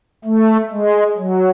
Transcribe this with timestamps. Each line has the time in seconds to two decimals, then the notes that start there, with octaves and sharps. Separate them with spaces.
0.24 A3
0.71 G#3
1.18 F#3